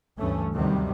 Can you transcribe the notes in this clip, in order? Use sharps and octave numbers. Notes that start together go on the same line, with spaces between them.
D2 G2 E3 A3 C#4
D#2 C3 D#3 F#3 G3